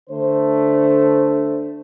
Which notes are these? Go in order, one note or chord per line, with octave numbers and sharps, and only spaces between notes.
D3 A3 C5